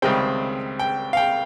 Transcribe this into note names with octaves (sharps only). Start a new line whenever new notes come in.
C#2 C3 D#3 G3 C4 G5
G5
F5
G5